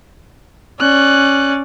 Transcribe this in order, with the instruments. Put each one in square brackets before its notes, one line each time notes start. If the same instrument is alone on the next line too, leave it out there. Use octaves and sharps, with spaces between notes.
[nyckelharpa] C#4 D5 [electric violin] F#6